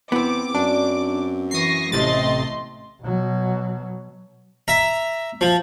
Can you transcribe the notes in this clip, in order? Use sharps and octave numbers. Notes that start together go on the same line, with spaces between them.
E2 B3 C4 D6
F#2 D4
E3 C#6 D#6 A#6 C7
A1 C3 A3 D#5 C6 A6
B2 F#3
E5 A#5
F3